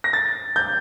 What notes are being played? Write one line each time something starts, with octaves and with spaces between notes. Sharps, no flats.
A#6
A6
G6